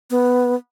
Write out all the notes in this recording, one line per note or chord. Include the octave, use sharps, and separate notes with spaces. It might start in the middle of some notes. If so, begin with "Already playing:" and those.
B3